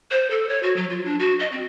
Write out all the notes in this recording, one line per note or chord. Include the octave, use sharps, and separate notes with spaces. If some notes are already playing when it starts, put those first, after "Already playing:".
C5
A4
C#5
F#4
F#3
F4
D4
F#4
D#5
C4